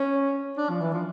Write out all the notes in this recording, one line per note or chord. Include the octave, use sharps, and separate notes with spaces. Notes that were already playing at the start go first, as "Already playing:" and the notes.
Already playing: C#4
D4
F3
E3
F3